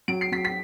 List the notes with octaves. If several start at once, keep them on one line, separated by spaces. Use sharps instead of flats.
F#3 D7
C7
F#3 B6
B6